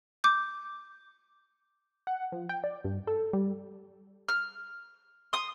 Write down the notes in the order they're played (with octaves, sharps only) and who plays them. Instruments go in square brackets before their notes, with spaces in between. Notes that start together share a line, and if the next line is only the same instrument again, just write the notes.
[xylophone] D6 G6
[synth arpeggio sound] F#5
F3
G5
D5
G2
A4
G3
[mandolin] F6
C6 D#6